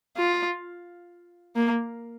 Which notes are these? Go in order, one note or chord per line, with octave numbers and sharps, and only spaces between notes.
F4
A#3